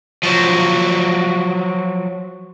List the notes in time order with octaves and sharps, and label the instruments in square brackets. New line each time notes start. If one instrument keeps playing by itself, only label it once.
[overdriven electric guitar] F3 F#3